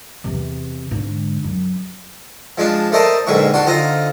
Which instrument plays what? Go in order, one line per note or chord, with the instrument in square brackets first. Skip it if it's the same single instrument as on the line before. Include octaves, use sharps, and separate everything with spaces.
[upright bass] E2 C3
G#2 D3
F#2
[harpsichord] F3 G#3 D4
A3 A#4 C5 D5 D#5 A5
A#1 F2 G#2 D3 B4 C#6
D4 F#4 C6
D3 C4 D#4 F4 A#5